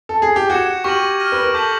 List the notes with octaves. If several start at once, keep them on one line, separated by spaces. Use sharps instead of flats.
A4
G#4
G4
F#4 G#6 C#7 E7
G4 C#6 F6 A#6 D#7 F#7
F6 A#6 D#7
B4
A#4
A4 D6 G6 B6 D#7 F#7